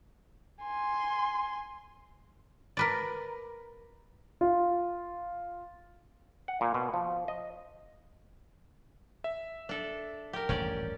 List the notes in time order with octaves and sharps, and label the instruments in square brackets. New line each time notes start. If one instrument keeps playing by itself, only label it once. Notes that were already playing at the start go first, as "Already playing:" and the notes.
[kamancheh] G#5 C6
[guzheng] A#4 B4 D5
[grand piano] F4
[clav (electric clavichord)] F#5
A#2
B2
F3
D#5
[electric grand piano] E5
[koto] D4 A4
G4 A#4
[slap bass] D#1 A1 G2 [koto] C#4 G4 D5